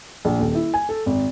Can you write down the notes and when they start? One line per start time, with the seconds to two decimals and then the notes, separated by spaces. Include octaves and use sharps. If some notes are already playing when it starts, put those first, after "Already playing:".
0.25 A#1
0.39 D#1
0.55 E4
0.74 G#5
0.89 A4
1.06 G#1